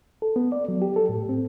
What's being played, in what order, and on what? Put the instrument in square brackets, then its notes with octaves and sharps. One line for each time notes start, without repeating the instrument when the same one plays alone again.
[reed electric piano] A4
B3
D5
F#3
G4
A4
A2
C4